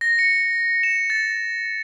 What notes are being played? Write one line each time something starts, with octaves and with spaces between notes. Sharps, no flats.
A#6
C#7
E7
A6